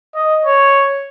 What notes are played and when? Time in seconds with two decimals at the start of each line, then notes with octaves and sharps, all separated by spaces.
0.15 D#5
0.45 C#5